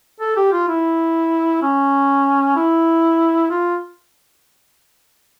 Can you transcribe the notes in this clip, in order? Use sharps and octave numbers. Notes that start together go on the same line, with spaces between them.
A4
G4
F4
E4
C#4
E4
F4